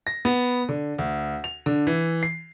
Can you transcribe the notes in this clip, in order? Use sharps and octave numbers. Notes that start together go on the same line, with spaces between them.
A#6
B3
D3
D2
F7
D3
E3
C7